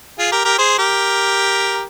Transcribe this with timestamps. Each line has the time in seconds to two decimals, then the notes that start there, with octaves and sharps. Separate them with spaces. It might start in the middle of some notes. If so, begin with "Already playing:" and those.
0.19 F4 G#4
0.32 G4 A#4
0.45 G4 A#4
0.58 G#4 C5
0.79 G4 A#4